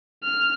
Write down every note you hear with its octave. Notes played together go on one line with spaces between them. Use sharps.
F6